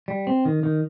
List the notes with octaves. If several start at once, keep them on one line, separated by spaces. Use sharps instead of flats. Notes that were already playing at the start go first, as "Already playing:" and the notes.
G3
C4
D#3
D#3